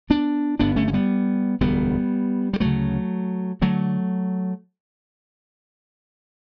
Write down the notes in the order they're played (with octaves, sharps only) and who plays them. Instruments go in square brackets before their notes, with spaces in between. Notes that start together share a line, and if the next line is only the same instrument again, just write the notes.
[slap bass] B3 D4
G1 G2 D3 B3 D4
A3 C#4
C#4
G3 B3
E1 D2 D3 G3 B3
G3
D2 C#3 F#3 A3
D3 F#3 A3